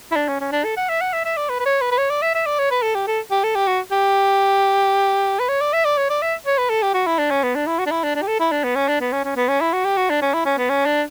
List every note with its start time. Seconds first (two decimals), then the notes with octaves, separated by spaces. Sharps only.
0.12 E4
0.16 D4
0.28 C#4
0.40 C#4
0.52 D4
0.64 A4
0.77 F#5
0.89 E5
1.01 F#5
1.13 E5
1.25 E5
1.37 D5
1.49 B4
1.59 B4
1.65 C#5
1.81 B4
1.91 B4
1.98 C#5
2.10 D5
2.22 E5
2.35 E5
2.46 D5
2.59 C#5
2.71 B4
2.82 A4
2.95 G4
3.07 A4
3.31 G4
3.43 A4
3.55 G4
3.67 F#4
3.91 G4
5.39 B4
5.48 C#5
5.61 D5
5.73 E5
5.85 D5
5.97 C#5
6.09 D5
6.22 E5
6.46 C#5
6.58 B4
6.70 A4
6.82 G4
6.94 F#4
7.06 E4
7.18 D4
7.31 C#4
7.43 B3
7.55 D4
7.67 E4
7.79 F#4
7.86 D4
7.91 E4
8.03 D4
8.15 D4
8.22 G4
8.28 A4
8.40 E4
8.52 D4
8.64 B3
8.75 C#4
8.88 D4
9.00 B3
9.12 C#4
9.25 C#4
9.36 B3
9.48 C#4
9.61 E4
9.73 F#4
9.85 G4
9.97 F#4
10.10 D4
10.22 C#4
10.34 E4
10.45 C#4
10.58 B3
10.69 C#4
10.86 D4